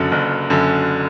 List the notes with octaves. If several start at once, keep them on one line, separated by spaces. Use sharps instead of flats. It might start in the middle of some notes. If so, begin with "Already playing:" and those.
Already playing: F#1 F#2 D3
F#1
F#2 D3